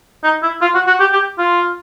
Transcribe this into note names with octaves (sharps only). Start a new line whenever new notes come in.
D#4
E4
F4
F#4
F#4
G4
G4
F4